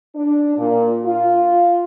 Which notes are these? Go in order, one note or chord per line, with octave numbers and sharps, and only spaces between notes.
D4
A#2
F4